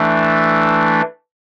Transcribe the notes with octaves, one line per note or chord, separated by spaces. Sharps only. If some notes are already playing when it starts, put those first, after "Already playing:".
Already playing: E3 A3 D4